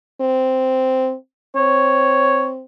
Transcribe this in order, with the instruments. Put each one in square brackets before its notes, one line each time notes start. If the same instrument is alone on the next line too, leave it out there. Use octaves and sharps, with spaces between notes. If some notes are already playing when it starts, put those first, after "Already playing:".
[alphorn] C4
[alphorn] C4 [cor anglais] C#5